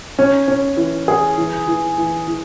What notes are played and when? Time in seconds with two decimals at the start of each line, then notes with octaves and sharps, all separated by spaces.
0.19 C#4
0.48 C#4
0.77 E3
1.08 G#4
1.37 E3
1.68 E3
1.98 E3
2.27 E3